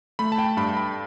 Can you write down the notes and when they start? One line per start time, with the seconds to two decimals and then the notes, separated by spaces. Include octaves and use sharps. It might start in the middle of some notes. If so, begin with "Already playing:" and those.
0.19 A3 B5
0.32 A5
0.38 G5
0.57 G2 B5
0.77 B5